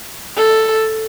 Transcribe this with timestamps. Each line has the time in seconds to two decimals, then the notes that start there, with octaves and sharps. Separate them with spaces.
0.37 A4